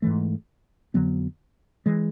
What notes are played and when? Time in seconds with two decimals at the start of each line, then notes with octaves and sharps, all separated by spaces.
0.02 G#2 E3 A3
0.94 F2 D3 F#3 B3
1.86 E3 G#3